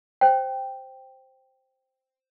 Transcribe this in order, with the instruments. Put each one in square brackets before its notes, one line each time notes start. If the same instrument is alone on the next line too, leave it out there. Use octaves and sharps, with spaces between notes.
[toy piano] C5 G5